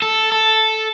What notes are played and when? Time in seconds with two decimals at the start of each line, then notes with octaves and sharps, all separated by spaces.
0.02 A4
0.32 A4